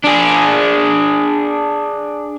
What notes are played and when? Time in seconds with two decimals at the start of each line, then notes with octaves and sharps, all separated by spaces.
0.04 D4 G#4